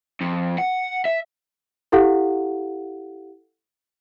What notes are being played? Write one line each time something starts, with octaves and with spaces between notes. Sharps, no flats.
F2
F#5
E5
E4 G4 A4 F5 F#5